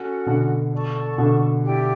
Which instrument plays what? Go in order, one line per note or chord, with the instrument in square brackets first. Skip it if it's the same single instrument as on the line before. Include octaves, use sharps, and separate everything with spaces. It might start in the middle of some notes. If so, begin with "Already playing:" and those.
Already playing: [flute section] C#4 F#4 A4
[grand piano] B2 D3
[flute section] A4 D5 A5 C#6
[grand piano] B2 D3
[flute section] E4 G4 D5 G5